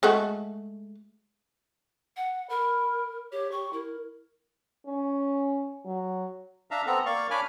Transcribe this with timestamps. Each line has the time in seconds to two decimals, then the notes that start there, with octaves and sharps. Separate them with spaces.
0.03 G#3 A3 F#4
2.16 F#5
2.50 A#4 B5
3.32 G4 C#5
3.51 G4 C#6
3.73 E4 A#4
4.86 C#4
5.85 F#3
6.71 D4 E5 F5 A#5
6.86 B3 C4 A4 A#5
7.06 A#3 D5 F5 C#6
7.31 D4 C#5 G#5 B5 D6 F6